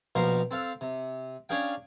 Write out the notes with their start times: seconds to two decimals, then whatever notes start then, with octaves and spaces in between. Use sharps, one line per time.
0.15 A#1 B2 F3 A#4 C5 F5
0.51 C4 A4 F5
0.81 C3
1.49 C#4 D4 G#4 F5 G5